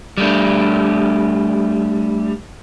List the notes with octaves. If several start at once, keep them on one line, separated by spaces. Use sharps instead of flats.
G3 A3 D4